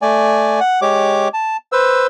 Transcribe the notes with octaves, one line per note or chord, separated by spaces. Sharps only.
A3 D5 G#5
F#5
G#3 G4 C#5 D6
A5
B4 C5 E6